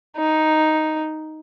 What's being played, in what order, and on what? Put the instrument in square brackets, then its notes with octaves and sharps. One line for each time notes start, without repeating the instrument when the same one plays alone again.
[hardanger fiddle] D#4